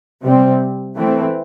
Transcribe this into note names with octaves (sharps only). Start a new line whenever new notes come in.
C3 G3 C4
E3 A3 C4